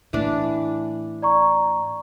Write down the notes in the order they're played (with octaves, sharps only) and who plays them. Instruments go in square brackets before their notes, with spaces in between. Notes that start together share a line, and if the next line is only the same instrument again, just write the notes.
[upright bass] A2 [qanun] E3 D4
[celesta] D5 A#5 C#6